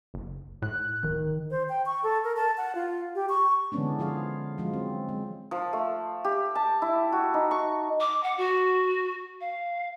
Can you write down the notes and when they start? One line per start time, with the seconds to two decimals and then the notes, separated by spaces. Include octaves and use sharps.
0.14 F#1
0.62 A2 F#6
1.03 D1 D#3
1.51 C5
1.69 G5
1.86 C#6
2.03 A4
2.24 A#4
2.36 A5
2.57 F#5
2.75 F4
3.15 G4
3.29 C#6
3.72 D3 E3 G#3 B3 C#4 D4
3.99 F3 F4 G#4 F5
4.58 F3 F#3 G#3 F4
4.73 C4
5.09 G#3
5.51 F3
5.73 A3
6.25 G4
6.55 A5
6.82 E4
7.12 F#4
7.34 D#4
7.51 C#6
8.00 D6
8.23 F#5
8.38 F#4
9.41 F5